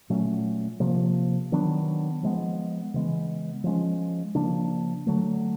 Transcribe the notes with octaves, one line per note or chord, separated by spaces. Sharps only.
A#2 F#3 A3 C#4
C3 F3 A#3
D#3 F#3 B3 D4
F3 G#3 B3
C#3 E3 G#3 B3
F3 G#3 C#4
C#3 F3 A#3 D4
D3 F#3 A3